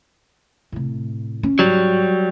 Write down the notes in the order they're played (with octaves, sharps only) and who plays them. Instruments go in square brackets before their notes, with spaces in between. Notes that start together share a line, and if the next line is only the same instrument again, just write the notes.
[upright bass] A2 C3
C#4
[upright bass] G#2 [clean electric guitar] F#3 G3